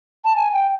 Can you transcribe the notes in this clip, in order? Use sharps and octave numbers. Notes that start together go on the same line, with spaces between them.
A5
G#5
G5